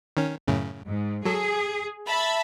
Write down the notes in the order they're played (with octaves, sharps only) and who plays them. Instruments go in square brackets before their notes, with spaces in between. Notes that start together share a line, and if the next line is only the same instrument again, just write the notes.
[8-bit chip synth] D#3 C#4
F#2 A2 C#3
[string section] G#2
[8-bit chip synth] F#3 A4 [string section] G#4
[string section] E5 A5 B5